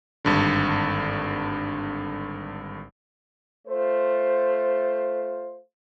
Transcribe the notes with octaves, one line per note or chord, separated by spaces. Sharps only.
G#1 G2 D3
A3 F4 C5